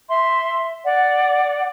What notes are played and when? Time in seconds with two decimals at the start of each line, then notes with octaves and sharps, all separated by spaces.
0.09 E5 C6
0.84 D5 F#5